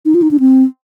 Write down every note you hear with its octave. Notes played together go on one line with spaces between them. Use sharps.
D#4
F4
D#4
D4
C4